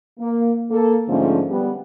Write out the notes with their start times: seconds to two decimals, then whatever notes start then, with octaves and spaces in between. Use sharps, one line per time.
0.19 A#3
0.71 A#3 A4
1.08 G#2 D3 F3 A3 C#4
1.51 G3 B3